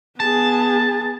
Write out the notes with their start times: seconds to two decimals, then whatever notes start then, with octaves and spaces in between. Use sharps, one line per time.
0.20 B3 G#4 A5